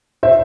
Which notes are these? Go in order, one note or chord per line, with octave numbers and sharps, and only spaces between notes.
C5 E5